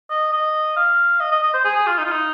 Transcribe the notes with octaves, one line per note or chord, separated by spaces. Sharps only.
D#5
D#5
F5
D#5
D#5
D#5
C5
G#4
G#4
F4
D#4
F4
D#4